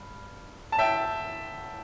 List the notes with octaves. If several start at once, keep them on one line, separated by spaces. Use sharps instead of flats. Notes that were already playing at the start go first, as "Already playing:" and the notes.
Already playing: G2
A5
E5 G5